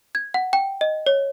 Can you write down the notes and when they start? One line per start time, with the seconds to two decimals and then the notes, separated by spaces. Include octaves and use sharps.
0.15 G#6
0.34 F#5
0.53 G5
0.81 D#5
1.06 C#5